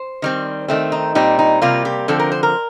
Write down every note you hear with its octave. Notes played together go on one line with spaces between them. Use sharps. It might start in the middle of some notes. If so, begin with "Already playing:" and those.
Already playing: C5
D#3 G3 C4
D#3 A3 C4
D#4
A#2 G3 C4 D#4
D#4
C3 G3 A#3 F4
G4
D3 F3 C4 A4
A#4
C5
A#4